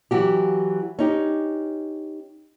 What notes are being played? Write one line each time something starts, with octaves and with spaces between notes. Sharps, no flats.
E3 F#3 F#4 G4
C#4 D#4 G4